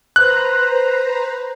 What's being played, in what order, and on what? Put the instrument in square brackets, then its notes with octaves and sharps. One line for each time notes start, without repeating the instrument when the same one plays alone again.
[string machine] B4 C5 A#5 [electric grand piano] F#6